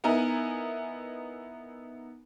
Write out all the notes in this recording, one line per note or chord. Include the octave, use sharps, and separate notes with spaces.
B3 D#4 E4 A#4 G#5